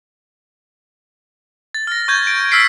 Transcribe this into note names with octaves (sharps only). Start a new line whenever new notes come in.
A6
F6 A#6
C#6 G6 G#6
D7
E6 F6 B6 C7 D7